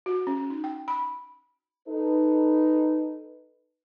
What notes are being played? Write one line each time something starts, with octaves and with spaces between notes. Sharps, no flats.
F#4
C#4
D#4
G5
B5
D#4 A4 B4